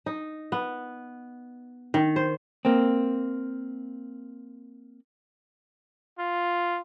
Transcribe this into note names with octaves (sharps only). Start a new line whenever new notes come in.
D#4
B3
D#3
C5
A#3 C4
F4